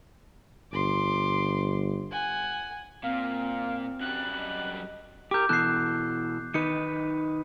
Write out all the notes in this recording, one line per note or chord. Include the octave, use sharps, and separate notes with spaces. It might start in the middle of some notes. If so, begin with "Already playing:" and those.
G1 C6 D6
F#5 G#5
A#2 C4 F5
F#2 G3 F#6
D#5
G4 A#4 D6 G6
B2 E3 A4 F#6 C7
D#3 D#4 B4 C#7